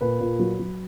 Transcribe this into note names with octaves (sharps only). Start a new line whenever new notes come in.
A#2 B4
A#2
F#3
F#3